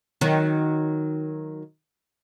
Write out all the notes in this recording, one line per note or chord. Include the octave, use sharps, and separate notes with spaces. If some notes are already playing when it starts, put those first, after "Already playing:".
D#3 F#3